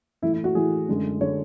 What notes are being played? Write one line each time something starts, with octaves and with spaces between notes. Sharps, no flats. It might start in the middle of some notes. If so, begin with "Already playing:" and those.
A2 E3 A3 E4
E4
F#4
A2 E3 A3 G#4
F#2 D3 G#3
D3 G#3 C#5